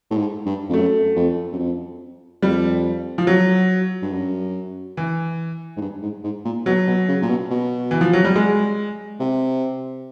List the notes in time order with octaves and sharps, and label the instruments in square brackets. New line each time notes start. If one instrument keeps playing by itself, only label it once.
[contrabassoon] A2
G#2
G2
F2
[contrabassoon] F#2 [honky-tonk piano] A3
[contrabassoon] F2
F#2
F2
[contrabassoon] F2 [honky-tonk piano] G3
[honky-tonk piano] F3
F#3
[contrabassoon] G2
F#2
[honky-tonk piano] E3
[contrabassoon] G#2
G2
G#2
G#2
A#2
[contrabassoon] B2 [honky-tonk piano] F#3
[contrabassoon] B2
C#3
A#2
B2
B2
[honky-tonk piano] E3
F3
F#3
G3
G#3
[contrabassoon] C3